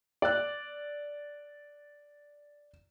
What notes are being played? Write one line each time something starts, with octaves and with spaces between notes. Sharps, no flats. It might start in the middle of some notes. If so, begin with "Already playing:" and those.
D5 F#6